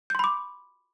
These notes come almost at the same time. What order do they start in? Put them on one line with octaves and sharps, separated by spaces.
G6 C6 B5 D6